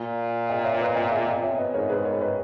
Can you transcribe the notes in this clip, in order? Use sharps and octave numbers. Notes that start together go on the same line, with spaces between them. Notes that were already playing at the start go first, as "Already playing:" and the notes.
Already playing: A#2
D#5 G5
C#5 E5
B4 D#5
D#5 G5
E5 G#5
D#5 G5
C#5 E5
B4 D#5
G#2 A#4 C#5
G#4 B4
A#4 C#5
B4 D#5